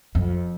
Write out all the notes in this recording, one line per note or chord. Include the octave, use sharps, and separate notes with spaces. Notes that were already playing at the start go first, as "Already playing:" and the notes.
F2